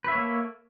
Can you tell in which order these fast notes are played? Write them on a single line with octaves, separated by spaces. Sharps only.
B4 E5 C#5 A#3 A4